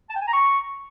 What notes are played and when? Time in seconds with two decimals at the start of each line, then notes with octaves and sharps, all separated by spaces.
0.10 A5
0.16 G5
0.21 G#5
0.27 A#5
0.33 C#6